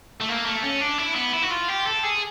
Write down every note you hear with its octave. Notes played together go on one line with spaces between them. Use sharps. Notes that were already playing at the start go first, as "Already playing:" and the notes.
A3
A#3
A3
C#4
D4
E4
B3
E4
F#4
F4
G4
A4
G#4